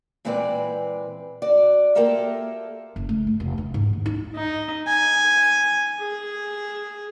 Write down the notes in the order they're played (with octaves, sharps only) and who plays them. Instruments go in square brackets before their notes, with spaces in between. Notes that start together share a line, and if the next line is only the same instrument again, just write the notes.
[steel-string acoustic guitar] A#2 E3 G#3 C4 B4 D5
F#4 D5
A#3 F4 G4 A4 A#4 E5
[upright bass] F#1
A3
G1
F1
D4
G#2
D#2
D#4
[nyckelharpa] D#4
G#5
G#4